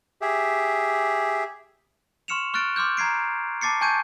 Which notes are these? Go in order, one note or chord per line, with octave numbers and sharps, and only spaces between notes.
G4 G#4 E5
C6 C#6 F6 C#7 E7 F7
C#6 F6 F#6 A6 D7
C6 D6 F6 G6
A#5 G#6 C7 D7
A5 D6 A6 C7 C#7
G#5 A5 C#6 G6 G#6 D#7